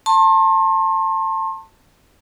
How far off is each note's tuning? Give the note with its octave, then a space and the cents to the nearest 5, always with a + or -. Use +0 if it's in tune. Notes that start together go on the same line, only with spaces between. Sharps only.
A5 +20 C6 +40